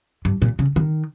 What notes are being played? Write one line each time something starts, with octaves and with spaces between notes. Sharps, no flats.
G2
A#2
C#3
D#3